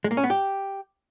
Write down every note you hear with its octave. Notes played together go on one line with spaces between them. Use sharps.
G#3
A#3
C#4
B3
G4